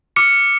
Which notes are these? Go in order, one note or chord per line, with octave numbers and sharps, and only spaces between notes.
D6 F6 C#7